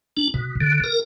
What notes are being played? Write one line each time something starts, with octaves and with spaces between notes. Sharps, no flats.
D4
B2
D3
A#4